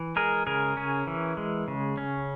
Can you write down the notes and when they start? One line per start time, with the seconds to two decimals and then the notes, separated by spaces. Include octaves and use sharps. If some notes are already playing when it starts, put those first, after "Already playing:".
Already playing: E3
0.16 G#3 G#4 A#4
0.47 C#3 G#4 A#4
0.77 C#4
1.07 E3
1.37 G#3
1.68 C#3
1.97 C#4